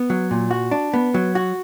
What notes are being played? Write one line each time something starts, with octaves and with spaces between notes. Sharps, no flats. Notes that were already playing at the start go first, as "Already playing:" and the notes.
Already playing: B3
F#3
A#2
F#4
D4
B3
F#3
F#4